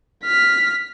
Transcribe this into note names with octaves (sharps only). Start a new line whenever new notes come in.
F6 B6